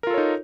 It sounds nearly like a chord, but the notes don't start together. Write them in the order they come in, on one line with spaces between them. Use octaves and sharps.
A#4 F4 A4 C#5 D#4